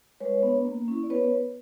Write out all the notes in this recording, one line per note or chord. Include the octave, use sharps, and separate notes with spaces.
G#3 B4 C#5
B3 D4
A#3
C#4 E4
D5
B3 B4 C#5